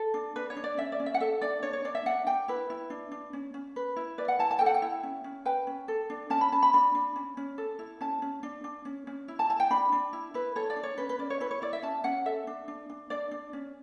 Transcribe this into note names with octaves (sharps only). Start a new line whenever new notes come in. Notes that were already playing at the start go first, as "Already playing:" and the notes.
Already playing: A4
D4
D4 B4
C#5
D4
D5
C#4 E5
D5
C#4
E5
F#5
A4 E5
D4 D5
D4 C#5
C#5
D4 D5
E5
D4 F#5
D4 G5
E4 B4
E4
D4
D4
C#4
C#4
B4
E4
B4 D5
F#5
E4 A5
A5
A4 G5
F#5
G5
E4
C#4
C#4
B4 G5
C#4
A4
D4
C#4 A5
B5
C#4 A5
B5
D4 B5
D4
C#4
C#4
A4
E4
C#4 A5
C#4
D4
D4
C#4
C#4
E4
A5
E4 A5
G5
D4 B5
D4
E4
E4 B4
A4 C#5
D5
D4
C#5
C#4 B4
B4
C#4 D5
C#5
E4 B4
C#5
E4 D5
E5
C#4 A5
C#4 F#5
A4 E5
D4
D4
D4
D4 D5
D4
C#4